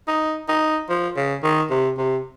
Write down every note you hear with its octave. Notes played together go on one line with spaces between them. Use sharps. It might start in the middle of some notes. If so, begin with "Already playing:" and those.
D#4
D#4
F3
C#3
D#3
C3
C3